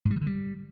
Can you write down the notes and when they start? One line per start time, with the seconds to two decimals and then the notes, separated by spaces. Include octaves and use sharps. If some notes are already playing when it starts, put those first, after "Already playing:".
0.05 G#2
0.11 G3
0.16 D#3
0.21 D3
0.27 G3